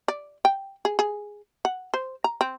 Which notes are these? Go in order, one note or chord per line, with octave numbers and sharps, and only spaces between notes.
D5
G5
G#4
G#4
F#5
C5
A#5
C4